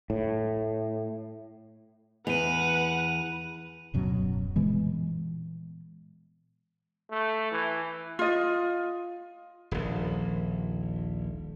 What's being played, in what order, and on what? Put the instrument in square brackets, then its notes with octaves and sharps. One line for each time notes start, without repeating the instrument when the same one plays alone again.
[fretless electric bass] A2
[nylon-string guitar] E2 [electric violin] B4 F#5 [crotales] D#7 F7
[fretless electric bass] D1 F#2 B2 F#3
A#2 E3 G#3 B3
[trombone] A3
E3
[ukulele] F4 D#5
[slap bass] D#1 A#1